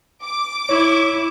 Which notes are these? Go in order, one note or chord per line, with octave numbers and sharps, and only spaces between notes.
D6
E4 C#5